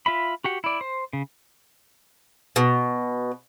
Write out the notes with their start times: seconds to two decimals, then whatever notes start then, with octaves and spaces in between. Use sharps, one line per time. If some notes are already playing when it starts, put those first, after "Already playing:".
0.06 F4 E5 B5
0.44 F#4 G4 F#5
0.64 E4 D5
0.81 C5
1.13 C#3
2.56 B2